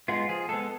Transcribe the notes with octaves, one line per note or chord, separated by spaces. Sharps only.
G#3 B3 F4
F3 G#4
G#3 B3 A4